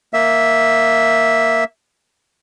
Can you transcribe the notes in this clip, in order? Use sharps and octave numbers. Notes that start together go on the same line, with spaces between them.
A#3 E5